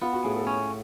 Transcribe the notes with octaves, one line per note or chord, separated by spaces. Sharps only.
B3 F4
F#4
A2 G#4
A4
C#4